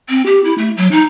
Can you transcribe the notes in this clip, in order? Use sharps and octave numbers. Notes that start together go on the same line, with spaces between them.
C4
G4
E4
A3
F#3
D#4